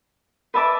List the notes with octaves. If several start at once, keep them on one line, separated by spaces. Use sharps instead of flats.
B4 E5 A5 D6